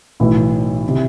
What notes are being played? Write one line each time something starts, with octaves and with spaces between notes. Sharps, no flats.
B1 A2 E3 E4
C3